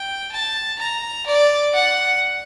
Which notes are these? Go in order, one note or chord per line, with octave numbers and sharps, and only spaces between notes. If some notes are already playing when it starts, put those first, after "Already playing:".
Already playing: G5
A5
A#5
D5
F#5